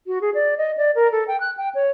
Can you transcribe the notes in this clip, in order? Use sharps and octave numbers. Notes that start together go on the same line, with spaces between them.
F#4
G#4
D5
D#5
D5
A#4
A4
G5
F#6
G5
C#5